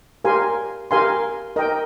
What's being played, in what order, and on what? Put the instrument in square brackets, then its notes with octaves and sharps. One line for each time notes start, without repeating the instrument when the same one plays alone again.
[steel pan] G4 A#4 F5 G#5 C6
G4 A#4 F5 G#5 C6
A#4 D#5 G5